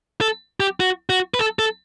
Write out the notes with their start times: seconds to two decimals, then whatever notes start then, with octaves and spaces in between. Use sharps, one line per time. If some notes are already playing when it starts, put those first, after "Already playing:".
0.21 A4
0.60 G4
0.80 F#4
1.10 F#4
1.34 B4
1.39 A4
1.59 A4